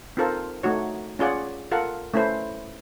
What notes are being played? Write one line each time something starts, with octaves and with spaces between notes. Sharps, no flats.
C4 D#4 F4 A4 A#4 C5
A3 D#4 F#4 C#5
C#4 F4 G#4 D5 F#5
F4 A4 A#4 F5 F#5
A3 C#4 E4 B4 C5